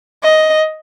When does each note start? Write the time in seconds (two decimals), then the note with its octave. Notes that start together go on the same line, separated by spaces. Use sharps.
0.23 D#5